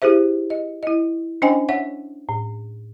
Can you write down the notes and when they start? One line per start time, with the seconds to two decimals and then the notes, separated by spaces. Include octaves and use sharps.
0.02 E4 G4 G#4 C5 E5
0.50 D#5
0.83 E4 D#5
1.42 C#4 D4 C5 D#5 G5 G#5
1.69 C#5 E5 F#5
2.29 A2